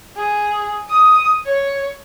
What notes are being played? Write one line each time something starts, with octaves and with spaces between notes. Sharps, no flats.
G#4
D#6
C#5